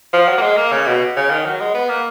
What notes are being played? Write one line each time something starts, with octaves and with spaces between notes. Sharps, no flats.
F3
F#3
A#3
G#3
A#3
C#3
B2
C#3
D#3
F#3
G#3
B3
A#3